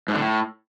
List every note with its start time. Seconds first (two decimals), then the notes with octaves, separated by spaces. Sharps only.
0.08 G#2
0.14 D3
0.21 A2